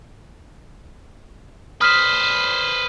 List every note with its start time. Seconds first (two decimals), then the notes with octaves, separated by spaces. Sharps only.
1.81 B4 C5 D#6 F6 B6